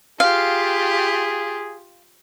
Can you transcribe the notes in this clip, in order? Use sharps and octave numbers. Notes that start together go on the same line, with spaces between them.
F4 G4 G#4 F5